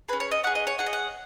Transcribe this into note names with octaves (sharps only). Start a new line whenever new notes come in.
C#4 G#4 B4
C#5
D#5
C#4 G#4 F#5
D#5
C#5
C#4 G#4 F#5
D#5
F#5